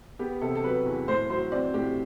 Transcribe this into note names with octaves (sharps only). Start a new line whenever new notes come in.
B3 G4
C3 A4
A4
F#3 B4
E2
A2 C5
F#3 C5
C4 D5
A2 G4